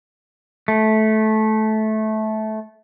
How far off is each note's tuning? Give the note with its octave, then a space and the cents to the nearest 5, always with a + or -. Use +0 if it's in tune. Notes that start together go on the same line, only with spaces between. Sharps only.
A3 -15